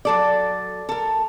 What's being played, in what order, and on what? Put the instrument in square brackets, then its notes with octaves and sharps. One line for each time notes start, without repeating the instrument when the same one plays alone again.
[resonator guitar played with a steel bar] F#3 A4 D5
A4 A#4